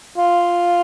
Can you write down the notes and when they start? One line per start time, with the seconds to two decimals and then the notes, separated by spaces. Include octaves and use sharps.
0.18 F4